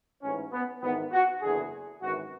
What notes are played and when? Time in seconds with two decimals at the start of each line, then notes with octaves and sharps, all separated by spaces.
0.22 A1 G#2 E3 C#4
0.52 B3
0.82 G#1 G#2 E3 B3
1.12 F#4
1.42 F#1 E2 D3 G#4
2.02 G#1 F#2 E3 F#4